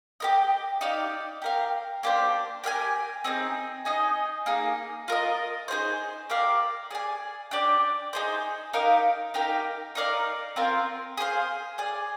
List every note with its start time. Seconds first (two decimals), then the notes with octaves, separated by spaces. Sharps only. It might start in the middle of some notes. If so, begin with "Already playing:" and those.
0.20 G4 A#4 D#5
0.81 D#4 G4 D5 F5
1.42 G4 A#4 F5
2.03 A#3 D4 G4 C5
2.64 G4 A#4 F5 G#5
3.24 C4 D#4 G#4
3.85 D#4 G#4 D#5 G#5
4.46 A#3 D#4 G#4
5.08 F4 A#4 D#5
5.68 D#4 G#4 C5
6.30 G4 A#4 D5 F5
6.91 G#4 D5 G#5
7.51 D4 G4 D5
8.13 D#4 G#4 C5
8.73 D#4 G4 A#4 F5
9.34 D#4 G4 A#4 F5
9.95 D#4 A#4 D5 F5
10.56 C4 F4 A#4
11.17 G#4 C5 F5
11.78 G#4 D5 G#5